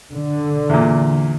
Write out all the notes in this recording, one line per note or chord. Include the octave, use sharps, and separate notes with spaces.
D3
E2 A#2